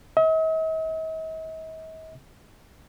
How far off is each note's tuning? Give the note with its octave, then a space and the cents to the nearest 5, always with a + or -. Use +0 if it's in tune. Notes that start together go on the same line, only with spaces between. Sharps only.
D#5 +45